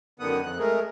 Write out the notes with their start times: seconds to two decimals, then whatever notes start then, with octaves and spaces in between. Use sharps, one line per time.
0.20 F#2 D3 D#3 B3 F#5 D#6
0.43 F2 F#6
0.59 G#3 A3 G#4 A#4